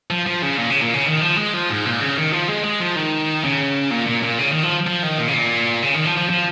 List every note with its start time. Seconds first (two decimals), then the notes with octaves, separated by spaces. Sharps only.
0.11 F3
0.27 F3
0.42 C#3
0.58 A#2
0.70 C#3
0.82 A#2
0.94 C#3
1.06 D#3
1.21 F3
1.37 G#3
1.54 F3
1.70 G#2
1.86 A#2
2.01 C#3
2.17 D#3
2.32 F3
2.48 G#3
2.64 G#3
2.80 F3
2.96 D#3
3.44 C#3
3.91 A#2
4.07 A#2
4.23 A#2
4.39 C#3
4.51 D#3
4.63 F3
4.87 F3
5.03 D#3
5.18 A#2
5.28 C#3
5.34 A#2
5.82 C#3
5.94 D#3
6.06 F3
6.17 F3
6.29 F3